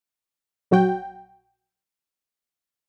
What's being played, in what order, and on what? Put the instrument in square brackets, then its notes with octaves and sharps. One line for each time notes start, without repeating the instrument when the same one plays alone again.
[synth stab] A#1 F#3 F#4 G5